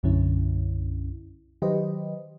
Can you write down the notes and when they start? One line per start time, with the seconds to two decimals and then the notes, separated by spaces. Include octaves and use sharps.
0.03 B1 F#2 D3 C#4 E4
1.62 D#3 F#3 G4 B4 C5 D#5